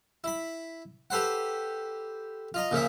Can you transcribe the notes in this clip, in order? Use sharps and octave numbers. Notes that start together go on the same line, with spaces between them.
E4 B5
G4 A4 B4 C5 F#5
F4 D#5 A#5
A#2 C#3 F3 E5